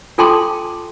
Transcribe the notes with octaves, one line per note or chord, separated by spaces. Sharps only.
F4 A4 G5 A5 C6 D6